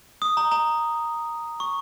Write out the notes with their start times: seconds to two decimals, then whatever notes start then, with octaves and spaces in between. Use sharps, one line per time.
0.22 D#6
0.37 A#5
0.52 A#5
1.60 C#6